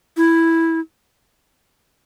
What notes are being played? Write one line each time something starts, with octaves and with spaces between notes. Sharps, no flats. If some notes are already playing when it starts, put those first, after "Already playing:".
E4